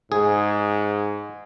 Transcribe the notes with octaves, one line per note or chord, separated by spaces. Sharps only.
G#2 G#4